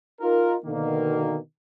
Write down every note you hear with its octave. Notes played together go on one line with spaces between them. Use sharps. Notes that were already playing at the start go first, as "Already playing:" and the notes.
D#4 F4 A#4
B2 D3 D#3 A#3